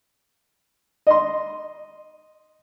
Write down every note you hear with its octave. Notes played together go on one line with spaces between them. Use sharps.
D#5 C6